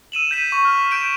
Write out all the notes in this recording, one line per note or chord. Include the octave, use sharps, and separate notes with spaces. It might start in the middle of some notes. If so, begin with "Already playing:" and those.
E6 D#7 E7 F#7
G6 B6 D#7
C#6
F6
G6 D7 E7